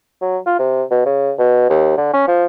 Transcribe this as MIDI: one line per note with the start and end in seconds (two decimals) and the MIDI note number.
0.22 0.38 54
0.46 0.56 65
0.59 0.83 48
0.91 1.04 47
1.06 1.32 49
1.38 1.65 47
1.70 1.97 39
1.97 2.10 50
2.13 2.25 61
2.28 2.45 53